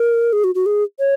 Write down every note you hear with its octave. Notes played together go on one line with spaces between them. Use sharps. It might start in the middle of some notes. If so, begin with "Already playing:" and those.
Already playing: A#4
G#4
F#4
F#4
G#4
C#5